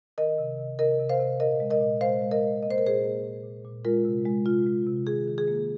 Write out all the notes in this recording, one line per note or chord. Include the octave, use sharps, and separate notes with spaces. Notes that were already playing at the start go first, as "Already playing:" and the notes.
D#3 A#4 D#5
C3
C3
C3 A#4 D#5
C3
C5 F5
C3
A#2 A#4 D#5
G#3
A#4 D#5
A#2
G#3 C5 F5
G#3
A#4 D#5
G#3
A#3 D#5
C5
A#4
A#2 G#4 C5
A#3
A#2
A#2
A#2
G#3 F4 A#4
C3
G#3
C3 F4
G#3
C3
D#3 G#4
D#3
G#4
A#3